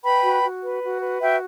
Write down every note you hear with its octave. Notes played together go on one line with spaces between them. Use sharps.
B4 G5 B5
F#4
F#4
B4
F#4
B4
F#4 E5 G5